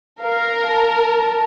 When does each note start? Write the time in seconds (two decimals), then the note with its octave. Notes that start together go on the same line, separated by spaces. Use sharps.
0.20 A#4 F5
0.68 A5